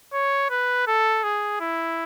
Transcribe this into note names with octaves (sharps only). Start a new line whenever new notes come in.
C#5
B4
A4
G#4
E4